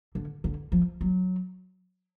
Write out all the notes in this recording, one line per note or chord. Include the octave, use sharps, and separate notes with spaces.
D3
D3
F3
F#3